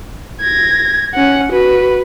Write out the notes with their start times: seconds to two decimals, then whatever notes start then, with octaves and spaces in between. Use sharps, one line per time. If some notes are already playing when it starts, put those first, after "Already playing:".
0.41 G#6 A#6
1.14 C#4 F#5
1.52 F#4 B4